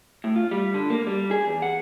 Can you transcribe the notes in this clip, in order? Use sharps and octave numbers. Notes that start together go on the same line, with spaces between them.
A2
F4
G3
D3
A#3
G3
G#4
E2
F#5